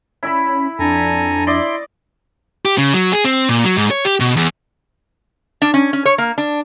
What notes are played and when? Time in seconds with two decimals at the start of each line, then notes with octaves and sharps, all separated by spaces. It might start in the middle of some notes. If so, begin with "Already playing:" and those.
0.23 C#4 E4 E5 B5
0.79 F2 D4 A4 G#5 A#5
1.47 E4 D5 D#5 C6
2.65 G4
2.78 C#3
2.94 F#3
3.13 G#4
3.25 C4
3.49 A#2
3.64 F#3
3.77 G#2
3.91 C#5
4.05 G4
4.20 B2
4.37 E2
5.62 D4
5.74 C#4
5.93 C#4
6.05 C#5
6.18 A#3
6.38 D4